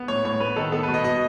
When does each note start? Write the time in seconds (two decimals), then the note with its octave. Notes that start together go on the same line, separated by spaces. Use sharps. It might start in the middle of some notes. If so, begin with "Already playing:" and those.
Already playing: B3
0.08 A2 C#5
0.24 A2 C#5
0.40 B3 B4
0.56 D#3 A4
0.72 B3 A4
0.83 B4
0.88 B2
0.94 D#5
1.04 B2 D#5